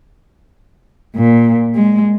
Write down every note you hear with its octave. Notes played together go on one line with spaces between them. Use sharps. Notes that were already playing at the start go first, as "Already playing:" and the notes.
A#2
G#3